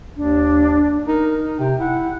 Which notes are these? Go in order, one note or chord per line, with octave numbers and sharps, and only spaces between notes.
D#2 D4
D#4 A#4
C3 G5
E4 F#5